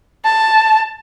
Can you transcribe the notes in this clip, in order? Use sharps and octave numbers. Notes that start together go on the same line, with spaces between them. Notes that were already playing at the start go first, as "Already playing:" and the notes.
A5